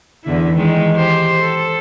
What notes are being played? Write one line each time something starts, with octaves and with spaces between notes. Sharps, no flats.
E2 D3 E4
D#3 E3 G#3
G4 C5
A4